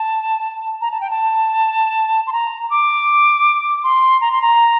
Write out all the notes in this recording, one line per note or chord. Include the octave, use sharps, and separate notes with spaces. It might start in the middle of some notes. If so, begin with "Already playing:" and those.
Already playing: A5
A#5
A5
G5
A5
C6
A#5
D6
C6
A#5
C6
A#5